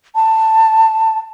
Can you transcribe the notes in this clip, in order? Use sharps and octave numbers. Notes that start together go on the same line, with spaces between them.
A5